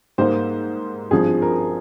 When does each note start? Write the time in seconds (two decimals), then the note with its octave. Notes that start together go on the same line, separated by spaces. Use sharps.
0.18 G#2 G3 A#3 D#4 C5
1.11 G#1 G2 F3 G#4
1.42 A#4